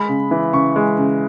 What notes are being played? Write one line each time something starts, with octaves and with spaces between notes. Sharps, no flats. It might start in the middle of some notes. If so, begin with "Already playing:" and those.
Already playing: G#3 B5
C#3
E3
C#3 C#6
G#3
C#3